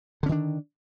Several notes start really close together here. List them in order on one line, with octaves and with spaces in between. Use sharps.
D3 C#4 D#3 D4